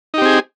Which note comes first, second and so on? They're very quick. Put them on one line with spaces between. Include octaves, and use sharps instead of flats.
D#4 G4 C4 G#4